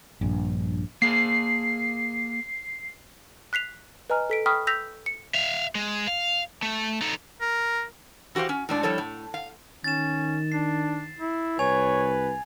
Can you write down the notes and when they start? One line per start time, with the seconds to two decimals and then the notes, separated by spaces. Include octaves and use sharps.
0.21 A#1 G2
1.02 A#3 G#4 C7
3.53 F#6 B6 C7 F7
4.10 B4 D#5 G#5 A#5 F6
4.30 A4 B6 D7
4.46 G5 B5 C#6 D#6 F6 B6
4.67 E6 G6 A#6 B6 F7
5.06 C#7
5.34 E5 F5
5.75 G#3
6.07 F5
6.62 A3
7.02 D#4 A4
7.41 A#4
8.35 E3 F#4 G4 C5 F5
8.49 C#4
8.69 A2 G#3 D4
8.83 F3 G3 E4 A4 C#5
8.98 A2
9.34 F5
9.84 D#3 C#4 A6 E7
10.52 D4 C7
11.19 E4
11.59 C2 B4 C#5 G#5 G#6 F7